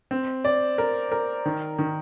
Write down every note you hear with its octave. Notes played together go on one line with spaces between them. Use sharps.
C4
D5
A#4
A#4
D#3
D#3